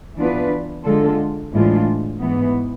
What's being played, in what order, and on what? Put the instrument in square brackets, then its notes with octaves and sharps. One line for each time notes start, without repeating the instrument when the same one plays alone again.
[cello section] E3 B3 D4 F4 B4
D3 G#3 D4 F4 A4
A2 E3 G#3 D4 F4
G#2 E3 B3